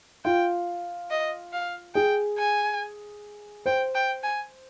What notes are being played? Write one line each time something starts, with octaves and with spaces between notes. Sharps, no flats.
F4 G5
D#5
F5
G#4 G5
G#5
C5 G5
G5
G#5